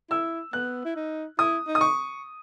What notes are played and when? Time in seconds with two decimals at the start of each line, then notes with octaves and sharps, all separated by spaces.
0.10 E4 E6
0.53 B3 F#6
0.85 E4
0.96 D#4
1.38 E4 D#6
1.67 D#4
1.75 D#6
1.81 C#6